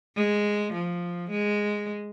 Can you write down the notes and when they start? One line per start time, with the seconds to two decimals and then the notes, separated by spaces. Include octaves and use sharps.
0.16 G#3
0.73 F3
1.30 G#3